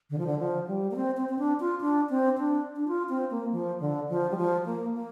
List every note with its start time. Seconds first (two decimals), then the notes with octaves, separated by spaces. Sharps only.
0.10 D3
0.18 F3
0.27 D3
0.39 F3
0.67 G3
0.91 A#3
0.96 C4
1.17 C4
1.29 C4
1.39 D4
1.60 F4
1.81 D4
2.10 C4
2.38 D4
2.76 D4
2.88 F4
3.10 C4
3.31 A#3
3.52 F3
3.80 D3
4.09 F3
4.31 G3
4.37 F3
4.66 A#3
4.95 A#3